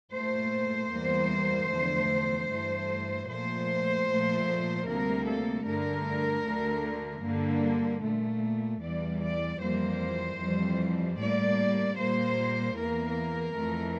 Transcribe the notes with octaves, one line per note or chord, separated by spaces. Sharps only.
A#2 A3 C5
E2 E3 G3 A#3
E2 D3 F3 A3
G2 E3 A3
A#2 F3 A3 C5
A#2 F3 A3
D2 C3 G3 A#3 A#4
A4
G2 D3 A3 A#4
D2 D3 A3
G2 D3 G3 A#3
A#2 A3
E2 E3 G3 D5
D5
F2 E3 G3 A#3 C5
F2 E3 G3
A2 G3 A#3 D5
A#2 G3 A#3 C5
E2 E3 A#3 A#4
F2 E3 A3